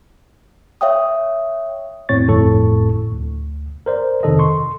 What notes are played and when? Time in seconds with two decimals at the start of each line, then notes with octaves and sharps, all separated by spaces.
0.81 C#5 E5 F5 G5 D#6
2.09 F2 A2 C4 C#5 C#6 A6
2.27 G1 F2 A2 A4 C#6
3.12 D2
3.86 A#4 C5 D5
4.23 F2 C3 D#3 A4 D#5
4.39 C6 C#6